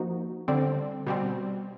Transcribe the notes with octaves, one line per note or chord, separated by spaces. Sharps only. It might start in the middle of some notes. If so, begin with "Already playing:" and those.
Already playing: F3 A#3 D#4 F#4
D3 G3 C4
B2 G3 C4